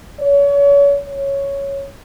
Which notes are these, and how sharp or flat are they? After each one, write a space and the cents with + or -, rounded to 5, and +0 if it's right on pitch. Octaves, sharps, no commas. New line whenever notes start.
C#5 +35
C#5 +0